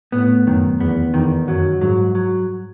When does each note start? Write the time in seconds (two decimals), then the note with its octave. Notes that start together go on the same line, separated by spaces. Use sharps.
0.12 A2 B3
0.46 F#2 D#3
0.80 E2 B3
1.14 E2 D#3
1.48 F#2 F#3
1.81 G#2 F#3
2.15 F#3